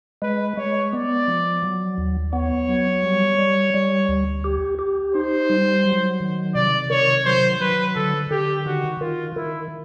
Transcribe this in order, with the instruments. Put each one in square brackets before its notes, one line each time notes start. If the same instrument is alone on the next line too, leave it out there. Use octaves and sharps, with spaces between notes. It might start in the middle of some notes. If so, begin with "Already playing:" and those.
[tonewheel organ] G#3 [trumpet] B4
[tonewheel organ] G#3 [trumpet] C#5
[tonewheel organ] B3 [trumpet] D5
[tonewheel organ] F3
F#3
D#2
[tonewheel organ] B3 [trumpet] C#5
[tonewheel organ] F#3
G3
G3
G3
D2
G4
G4
[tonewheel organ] D#4 [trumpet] C5
[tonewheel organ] G3
F#3
D#3
[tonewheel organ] C3 [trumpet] D5
[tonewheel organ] D#3 [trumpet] C#5
[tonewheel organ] F#3 [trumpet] C5
[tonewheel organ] F#3 [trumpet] B4
[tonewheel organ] D3 [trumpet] A4
[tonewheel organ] D3 [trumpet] G4
[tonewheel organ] D#3 [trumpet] F#4
[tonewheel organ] D#3 [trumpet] F4
[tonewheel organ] D#3 [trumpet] E4